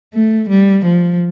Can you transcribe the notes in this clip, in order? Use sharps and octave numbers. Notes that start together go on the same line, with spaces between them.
A3
G3
F3